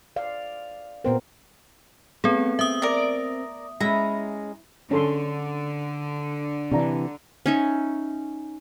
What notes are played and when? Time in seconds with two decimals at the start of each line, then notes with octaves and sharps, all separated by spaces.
0.16 D5 F5
1.04 A#2 B3 C4 A#4
2.24 A3 B3 C4 G#4 C#5
2.59 C4 E5 D#6
2.82 A#4 D5
3.80 G#3 C#4 E4 A#5
4.91 D3 C#4 A4 C6
6.72 C3 D#3 E3 D4 A#5
7.46 C#4 D#4 E5